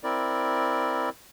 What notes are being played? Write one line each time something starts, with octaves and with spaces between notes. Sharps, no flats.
C4 E4 A#4 D5